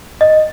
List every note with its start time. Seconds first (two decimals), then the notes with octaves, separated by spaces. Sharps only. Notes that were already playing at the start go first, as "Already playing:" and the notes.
0.21 D#5